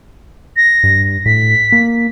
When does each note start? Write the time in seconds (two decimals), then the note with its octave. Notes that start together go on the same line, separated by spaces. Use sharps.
0.57 A#6
0.84 G2
1.26 A2 B6
1.72 A#3